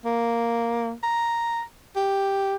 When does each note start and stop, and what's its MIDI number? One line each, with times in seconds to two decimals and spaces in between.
0.05 0.92 58
1.03 1.62 82
1.96 2.56 67